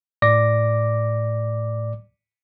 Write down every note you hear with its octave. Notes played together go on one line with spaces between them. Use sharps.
A2 D5 D6 A#6